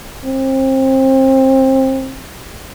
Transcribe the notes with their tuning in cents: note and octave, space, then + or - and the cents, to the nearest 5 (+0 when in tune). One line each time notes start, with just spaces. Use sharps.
C4 +25